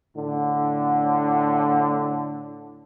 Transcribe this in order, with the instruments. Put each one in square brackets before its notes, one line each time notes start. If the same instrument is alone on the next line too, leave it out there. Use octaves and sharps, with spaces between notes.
[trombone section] A2 D3